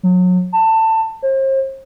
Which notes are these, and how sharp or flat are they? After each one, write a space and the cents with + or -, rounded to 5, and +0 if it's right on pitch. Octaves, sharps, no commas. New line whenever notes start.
F#3 -30
A5 +20
C5 +40